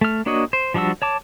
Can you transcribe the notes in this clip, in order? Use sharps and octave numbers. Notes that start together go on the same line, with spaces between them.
A3 F6
A#3 D4 F#4 C#5 D#5
C5
F3 G3 D4 F#4 E6
C#5 A5 D6